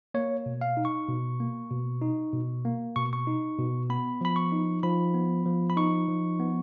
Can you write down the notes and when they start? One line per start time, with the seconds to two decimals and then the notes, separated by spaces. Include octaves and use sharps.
0.14 A#3 C#5
0.46 B2
0.61 F5
0.77 D#4
0.85 C#6
1.09 B2
1.40 A#3
1.71 B2
2.02 D#4
2.33 B2
2.65 A#3
2.96 B2 C#6
3.13 C#6
3.27 D#4
3.58 B2
3.90 B3 B5
4.21 F3 B5
4.36 C#6
4.52 D#4
4.83 F3 B5
5.14 B3
5.46 F3
5.70 B5
5.77 D#4 C#6
6.08 F3
6.40 B3